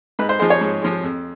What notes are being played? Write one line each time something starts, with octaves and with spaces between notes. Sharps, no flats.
G#2 B4
C5
F3 G#3 C5
C#5
G#2
F3 G#3
F2